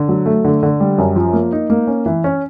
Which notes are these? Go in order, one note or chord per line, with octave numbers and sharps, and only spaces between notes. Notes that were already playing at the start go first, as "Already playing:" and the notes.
Already playing: D3
F#3
A3
D3
D3
G3
F#2
F3
A#3
D#4
A#3
C#4
E3
C#4